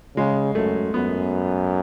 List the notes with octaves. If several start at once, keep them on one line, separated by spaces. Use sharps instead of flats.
C#3 G#3
F#2 A3
F#2 B3